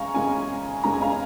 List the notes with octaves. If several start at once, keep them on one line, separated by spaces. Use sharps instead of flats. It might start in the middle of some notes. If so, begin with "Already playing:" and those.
Already playing: G#3 C#4 F5 G#5 A#5 C#6
C#3 G#3 C#4 G#5
C#3 G#3 C#4 A#5
G#5
F5 A#5